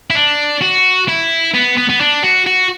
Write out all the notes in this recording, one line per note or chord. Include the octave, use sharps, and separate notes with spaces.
E4
D4
F#4
E4
B3
B3
B3
D4
F#4
F#4